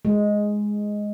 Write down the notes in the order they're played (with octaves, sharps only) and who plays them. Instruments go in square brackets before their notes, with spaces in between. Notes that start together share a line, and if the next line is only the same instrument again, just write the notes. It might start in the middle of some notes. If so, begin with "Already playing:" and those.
[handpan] G#3